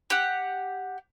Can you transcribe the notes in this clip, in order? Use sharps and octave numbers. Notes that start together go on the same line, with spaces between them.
G4 F#5